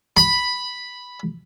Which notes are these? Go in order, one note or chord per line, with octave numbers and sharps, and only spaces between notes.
B5